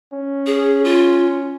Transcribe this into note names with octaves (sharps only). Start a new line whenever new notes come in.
C#4
G#4
F4